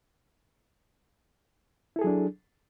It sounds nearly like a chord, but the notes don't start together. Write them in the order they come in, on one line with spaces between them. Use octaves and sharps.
E4 A4 G#4 F#3 D4